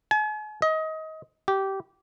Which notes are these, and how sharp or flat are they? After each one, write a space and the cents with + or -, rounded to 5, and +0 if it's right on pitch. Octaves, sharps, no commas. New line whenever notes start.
G#5 +45
D#5 +25
G4 -15